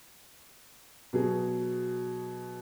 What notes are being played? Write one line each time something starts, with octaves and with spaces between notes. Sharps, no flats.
B2 F#3 G#4